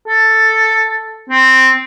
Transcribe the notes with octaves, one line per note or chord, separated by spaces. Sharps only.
A4
C4